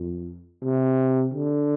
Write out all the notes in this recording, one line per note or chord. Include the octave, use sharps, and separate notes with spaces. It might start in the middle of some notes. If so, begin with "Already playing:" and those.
Already playing: F2
C3
D3